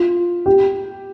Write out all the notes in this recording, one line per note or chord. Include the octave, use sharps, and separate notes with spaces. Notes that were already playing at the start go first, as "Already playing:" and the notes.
Already playing: F4
G4